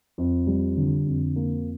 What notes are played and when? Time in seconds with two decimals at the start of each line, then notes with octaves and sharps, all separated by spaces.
0.18 F2
0.47 G3
0.77 D3
1.07 F2
1.36 A#3